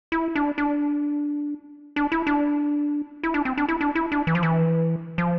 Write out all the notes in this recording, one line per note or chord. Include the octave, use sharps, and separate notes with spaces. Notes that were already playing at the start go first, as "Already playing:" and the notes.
E4
D4
D4
D4
E4
D4
E4
D4
C4
D4
E4
D4
E4
D4
E3
F3
E3
F3